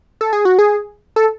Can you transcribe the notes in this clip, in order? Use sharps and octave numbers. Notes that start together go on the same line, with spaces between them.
A4
G#4
F#4
G#4
A4